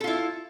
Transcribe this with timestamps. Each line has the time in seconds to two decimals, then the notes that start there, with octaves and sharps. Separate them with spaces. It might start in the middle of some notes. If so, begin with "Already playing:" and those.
0.01 A4
0.04 F4
0.07 E4